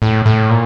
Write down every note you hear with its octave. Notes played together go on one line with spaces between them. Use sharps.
A2
A2
A#2